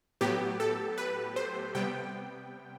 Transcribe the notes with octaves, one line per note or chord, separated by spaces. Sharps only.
A2 F#3 B3 G4
A4
B4
C5
C3 G3 B3 G5